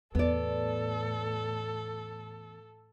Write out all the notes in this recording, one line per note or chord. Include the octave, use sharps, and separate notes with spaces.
E2 A2 B3 A4 D5